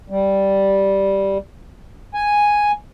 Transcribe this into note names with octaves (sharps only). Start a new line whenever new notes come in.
G3
G#5